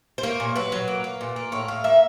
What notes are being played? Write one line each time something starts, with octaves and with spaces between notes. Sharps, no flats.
C5
A#3 C#5
A#2
F#3 B4
F#3
A#3
A#3
A#2
A#3
A2 C#5
A2 F5
A#3 E5